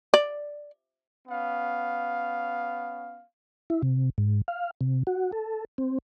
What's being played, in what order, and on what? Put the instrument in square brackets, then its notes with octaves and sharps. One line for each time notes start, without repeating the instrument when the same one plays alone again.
[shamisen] D5
[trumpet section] B3 C#4 F5
[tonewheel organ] E4
C3
G#2
F5
C3
F#4
A4
C4